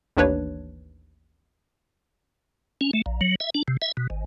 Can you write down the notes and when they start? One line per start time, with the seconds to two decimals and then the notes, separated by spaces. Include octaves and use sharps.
0.17 A1 D#2 D4 B4 C#5
2.81 C#4
2.93 A3
3.06 A#1
3.21 F#3
3.40 E5
3.55 D4
3.68 C3
3.82 E5
3.97 B2
4.10 G#1